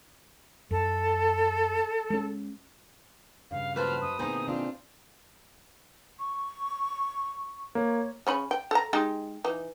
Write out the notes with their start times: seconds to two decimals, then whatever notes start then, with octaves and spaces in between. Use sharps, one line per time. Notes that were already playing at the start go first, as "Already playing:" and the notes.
0.71 F#2 A4
2.10 G#3 C#4
3.51 G2 C#3 F5
3.76 F#3 A#3 F4 B4 C5 A5 F6
4.01 F#2 D#6
4.19 C3 A#3 B3 D#4 G#4 C5
4.47 C4 D4 F4
6.19 C#6
7.75 A#3 C#5
8.27 C#3 C#4 B5
8.51 G5
8.71 A4 A#5
8.93 G#3 D#4 G4
9.44 E3 D#4